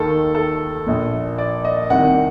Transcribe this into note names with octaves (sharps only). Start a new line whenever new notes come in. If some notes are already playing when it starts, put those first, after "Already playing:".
Already playing: D#2 D#3 A4
A4
A#1 A#2
D5
D#5
C2 C3 D#3 F#5